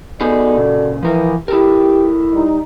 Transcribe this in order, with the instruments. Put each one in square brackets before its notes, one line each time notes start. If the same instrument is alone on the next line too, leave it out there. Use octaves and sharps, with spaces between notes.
[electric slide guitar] B3 D#4 G#4 [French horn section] F#4 A4 D5
[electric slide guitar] A#2 C#3
[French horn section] E3 [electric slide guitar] F3 A#4
[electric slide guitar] E4 A4 A#4 [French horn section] G4
[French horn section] G3 D#4